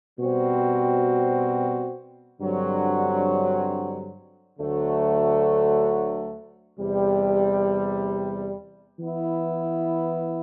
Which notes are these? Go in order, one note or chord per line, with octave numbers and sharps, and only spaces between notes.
B2 G3 C4 F#4 C5
G2 D3 F#3 C4
D2 D3 F#3 A3
E2 C3 G3
E3 B3 E4